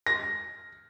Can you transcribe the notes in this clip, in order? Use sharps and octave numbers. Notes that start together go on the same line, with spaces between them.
A#6